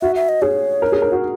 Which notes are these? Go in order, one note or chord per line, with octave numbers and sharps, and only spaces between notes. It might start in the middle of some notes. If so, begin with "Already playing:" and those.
F#4 E5
E5
D#5
G#4 C#5
A#4
G#4
A#4
F#4